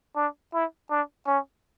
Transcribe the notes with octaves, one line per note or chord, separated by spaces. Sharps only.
D4
E4
D4
C#4